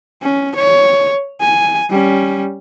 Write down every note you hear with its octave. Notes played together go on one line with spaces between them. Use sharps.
C#4
C#5
G#5
G3 C#4